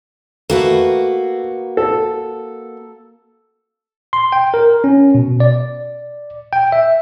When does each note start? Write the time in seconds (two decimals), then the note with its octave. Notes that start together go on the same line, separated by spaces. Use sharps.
0.50 A3 A#3 F#4 B4
1.77 A4
4.13 C6
4.32 G5
4.54 A#4
4.84 C#4
5.15 B2
5.40 D5
6.53 G5
6.72 E5